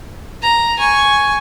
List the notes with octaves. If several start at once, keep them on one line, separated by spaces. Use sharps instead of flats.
A#5
G#5 C#6